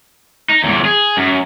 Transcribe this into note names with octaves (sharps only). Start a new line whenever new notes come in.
D#4
E2 A#2
G#4
F#2